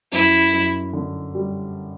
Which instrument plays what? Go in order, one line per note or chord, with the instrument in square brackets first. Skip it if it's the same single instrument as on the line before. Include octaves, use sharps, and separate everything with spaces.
[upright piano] F#2 [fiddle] E4
[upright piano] F#2
D3
G3